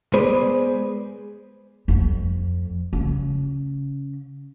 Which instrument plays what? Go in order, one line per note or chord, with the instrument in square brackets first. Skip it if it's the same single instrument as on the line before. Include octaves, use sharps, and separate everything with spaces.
[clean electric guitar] G#3 B3 G#4 B4 C5 D5
[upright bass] F2
C#3